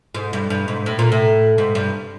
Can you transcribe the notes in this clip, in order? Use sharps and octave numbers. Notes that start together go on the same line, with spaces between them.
G#2
G2
G2
G#2
A2
A#2
A2
G#2
G2